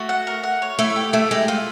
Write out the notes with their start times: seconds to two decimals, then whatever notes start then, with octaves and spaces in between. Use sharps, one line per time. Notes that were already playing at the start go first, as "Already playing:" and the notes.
Already playing: A3 F#4
0.09 F#5
0.27 A#4
0.43 F#5
0.62 C#5
0.79 A3 E4
0.96 G4
1.13 A3 E4
1.31 G#3 G4
1.48 A3 F4